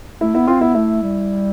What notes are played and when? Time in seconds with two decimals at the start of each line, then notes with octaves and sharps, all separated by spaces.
0.21 A3 E4
0.34 B3 E4
0.48 C4 F4
0.61 B3 E4
0.75 A3 E4
1.02 G3